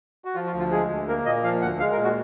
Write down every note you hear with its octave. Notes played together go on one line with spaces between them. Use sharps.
F#4
F3 F4
F4
D2
F4
G#3 G#4
D2
A#3 A#4
A#2 D#5
F3 F5
D2 F#5
G#3 F5
A#4
A#2
F#4